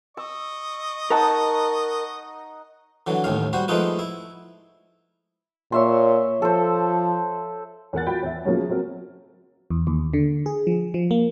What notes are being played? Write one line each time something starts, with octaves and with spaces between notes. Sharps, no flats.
D#5 C#6 E6
D#4 A#4 F#5 A5
D3 E3 F#3
A1 D#2 A2 F5
G3 F#4 C5
F3 G#3 A3 D#4 F4 B4
E4
A#2 C#5 E5 C6
F3 A4 C5
E2 A#4 F#5 A6
F4 F#4 F#5 G5 B5
E2 E5
C#3 F3 F#3 A#3 B3 C#4
F#3 C4 F#4 A#4
E2
D#2
D3
G#4
F3
F3
A#3